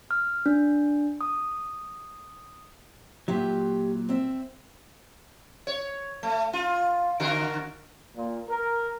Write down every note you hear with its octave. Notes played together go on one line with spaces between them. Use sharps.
F6
D4
D#6
A#2 F#3 F4 G4 E5
C4 E5
C#5
A3
F4
D3 F#4 A#4
A#2
A#4